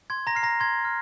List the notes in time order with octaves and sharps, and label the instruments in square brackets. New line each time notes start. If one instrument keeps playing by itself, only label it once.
[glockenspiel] C6 G#6
A#5 A#6
F6 C7
A#5 A#6
C6 G#6
F6